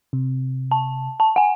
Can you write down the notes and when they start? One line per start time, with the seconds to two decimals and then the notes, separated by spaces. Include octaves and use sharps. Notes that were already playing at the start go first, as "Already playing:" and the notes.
0.13 C3
0.71 A5
1.20 A5
1.36 F#5 G#5